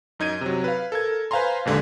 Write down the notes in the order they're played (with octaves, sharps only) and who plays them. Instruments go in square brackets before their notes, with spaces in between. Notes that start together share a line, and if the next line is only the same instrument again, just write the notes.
[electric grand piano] F#2 D#4 G#6 D#7
C3 F#3
B4 F5
A4 A#4 G#6
B4 C5 F5 G#5 A#5 C6
A#1 D#2 D3 G#3